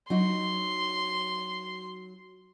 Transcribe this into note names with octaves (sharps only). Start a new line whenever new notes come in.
F#3 D#4 F#4 C6